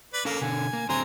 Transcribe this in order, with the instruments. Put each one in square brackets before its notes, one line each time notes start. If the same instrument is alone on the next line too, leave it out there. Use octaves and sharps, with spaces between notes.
[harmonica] B4 D5
[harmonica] A#3 [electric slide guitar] C#4 A4 F5
[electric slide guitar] B2 D3 [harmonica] G#5
[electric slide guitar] A#3
[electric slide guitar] D3 F#3 C4 [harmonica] G#5 A#5 C6